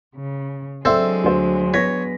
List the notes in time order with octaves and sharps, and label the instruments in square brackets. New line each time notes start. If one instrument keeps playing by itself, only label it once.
[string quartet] C#3
[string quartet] F#3 G#3 D4 [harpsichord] C4 A4 [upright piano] D5 E5
[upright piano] D2 C5
[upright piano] B3 A#6 B6 [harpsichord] C#5